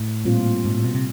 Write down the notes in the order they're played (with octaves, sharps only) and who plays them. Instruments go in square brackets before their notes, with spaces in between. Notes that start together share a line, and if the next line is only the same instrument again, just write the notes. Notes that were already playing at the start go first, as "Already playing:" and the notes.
Already playing: [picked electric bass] A2
[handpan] A#2 G3 C4 F4
[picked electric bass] G#2
A2
B2
C3